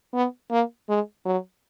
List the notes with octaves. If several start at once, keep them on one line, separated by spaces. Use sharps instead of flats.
B3
A#3
G#3
F#3